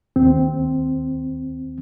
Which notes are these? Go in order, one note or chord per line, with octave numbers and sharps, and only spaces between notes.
D#2 C4